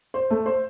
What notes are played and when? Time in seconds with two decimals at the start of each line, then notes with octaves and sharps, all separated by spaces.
0.14 C5
0.30 A3
0.46 C5